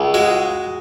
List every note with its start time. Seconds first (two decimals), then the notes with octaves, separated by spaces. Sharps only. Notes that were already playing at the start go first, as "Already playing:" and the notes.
Already playing: C#2 G#4
0.14 G#3 F#4